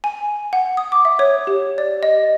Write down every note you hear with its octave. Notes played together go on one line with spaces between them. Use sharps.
G#5
F#5
D#6
D6
E5
C#5
G4
D5
D#5